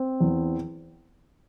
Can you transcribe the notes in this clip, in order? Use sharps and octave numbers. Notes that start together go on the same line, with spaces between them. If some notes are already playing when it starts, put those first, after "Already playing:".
Already playing: C4
E2